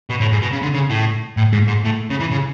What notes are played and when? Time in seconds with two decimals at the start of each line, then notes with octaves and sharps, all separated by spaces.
0.10 B2
0.21 A2
0.32 G#2
0.42 B2
0.52 C#3
0.62 D3
0.74 C#3
0.89 A2
1.37 A2
1.53 G#2
1.67 G#2
1.84 A2
2.10 C#3
2.20 E3
2.31 C#3